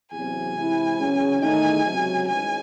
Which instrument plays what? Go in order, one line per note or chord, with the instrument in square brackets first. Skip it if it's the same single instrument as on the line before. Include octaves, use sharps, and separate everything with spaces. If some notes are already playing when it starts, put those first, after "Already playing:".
[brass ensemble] E2 C3 F#3 [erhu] G#5
[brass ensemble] C3 E3 G#3 C4 E4
E2 C#3 F#3 C#4
[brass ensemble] E2 D#3 A3 D#4 [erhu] G#5
[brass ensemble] C#2 C3 F#3
[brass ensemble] G#1 G#2 E3 G#3 C#4 [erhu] G#5